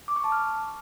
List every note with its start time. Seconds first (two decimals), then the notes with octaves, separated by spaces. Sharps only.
0.08 D6
0.16 C#6
0.24 A5
0.32 F6